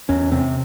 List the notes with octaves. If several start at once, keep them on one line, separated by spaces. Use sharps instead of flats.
E2 C#4
C3 C4